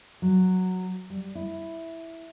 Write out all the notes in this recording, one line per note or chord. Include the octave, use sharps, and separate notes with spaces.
F#3
G3
E4